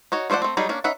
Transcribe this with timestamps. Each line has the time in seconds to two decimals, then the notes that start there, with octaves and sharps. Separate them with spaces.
0.12 D#4 F#4 C#5
0.30 F3 A3 C5 D5 F#5
0.42 A3 C4
0.57 F#3 G3 D#4 G#4
0.69 A#3 C#4 D4
0.84 C#4 D#4 B4 E5 F#5